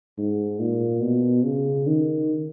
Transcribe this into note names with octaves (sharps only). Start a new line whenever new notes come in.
G#2
A#2
B2
C#3
D#3